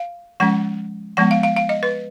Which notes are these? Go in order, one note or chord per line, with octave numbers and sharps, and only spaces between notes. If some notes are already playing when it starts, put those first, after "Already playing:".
Already playing: F5
F3 G#3 C#4 F#5
F3 G#3 B3 F#5
F5
F5
F5
D#5
B4